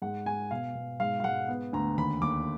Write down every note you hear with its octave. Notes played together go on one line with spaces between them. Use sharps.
G#2 F#5
G#2 G#5
B2 F5
B2
G#2 F5
F5
G#2 F#5
B3
D2 A#5
D#2 B5
D#2 D6